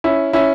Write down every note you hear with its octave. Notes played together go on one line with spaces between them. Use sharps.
C#4 E4
C#4 E4